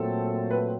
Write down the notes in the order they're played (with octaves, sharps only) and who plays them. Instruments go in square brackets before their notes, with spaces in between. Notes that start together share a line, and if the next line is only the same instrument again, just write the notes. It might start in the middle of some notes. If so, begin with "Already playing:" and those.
Already playing: [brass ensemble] A#2 F#3 A3 C4 [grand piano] A4
[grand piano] B4